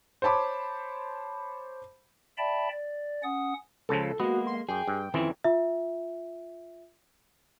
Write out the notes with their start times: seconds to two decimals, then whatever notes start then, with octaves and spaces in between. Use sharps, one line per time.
0.22 C5 C#5 A5 B5 D6
2.38 D5 E5 G5 A5 B5
2.71 D5
3.23 C#4 F#5 D#6
3.89 C#2 C#3 F3 A4
4.20 G#3 A#3 B3 F#4
4.47 C6
4.69 F#2 G#4 G5
4.88 G2
5.14 F2 D#3 E3 C4 C#4 E4
5.44 F4 E5